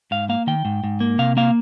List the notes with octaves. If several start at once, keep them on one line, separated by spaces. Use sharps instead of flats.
G#2 F5
A#3 F5
D#3 G5
G#2
G#2
A#3
C3 F5
A#3 F5